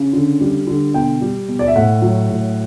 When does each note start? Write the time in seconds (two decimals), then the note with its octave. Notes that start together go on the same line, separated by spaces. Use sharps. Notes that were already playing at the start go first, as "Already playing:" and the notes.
Already playing: C#3
0.13 D3
0.41 G3
0.67 D3
0.94 B2 G5
1.21 G3
1.48 B2
1.59 D5
1.67 E5
1.76 A2 F#5
2.02 F#3
2.30 A2